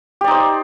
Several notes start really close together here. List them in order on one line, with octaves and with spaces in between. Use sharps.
G4 D5 D#4 C5